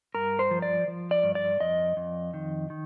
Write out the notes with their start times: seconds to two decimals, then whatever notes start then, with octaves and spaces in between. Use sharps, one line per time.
0.15 G2 A#4
0.39 C5
0.51 F3
0.62 D5
0.88 F3
1.11 D5
1.23 G2
1.35 D5
1.61 F2 D#5
1.97 F2
2.34 D#3
2.70 D#3